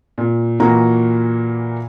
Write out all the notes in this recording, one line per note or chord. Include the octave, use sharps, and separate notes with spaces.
A#2
A#2 E3 A#3 F#4 A#5